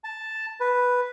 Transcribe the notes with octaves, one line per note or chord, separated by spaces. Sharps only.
A5
B4